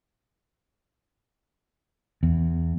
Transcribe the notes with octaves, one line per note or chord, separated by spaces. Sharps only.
E2